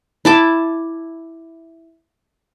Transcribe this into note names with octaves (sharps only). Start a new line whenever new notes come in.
E4 A5 D6